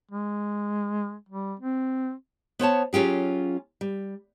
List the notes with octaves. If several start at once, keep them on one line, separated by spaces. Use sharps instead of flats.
G#3
G3
C4
B3 C5 C#5 A5
F#3 C#4 F4 G4 G#4
G3